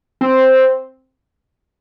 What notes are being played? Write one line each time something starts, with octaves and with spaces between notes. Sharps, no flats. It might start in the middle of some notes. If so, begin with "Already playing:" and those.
C4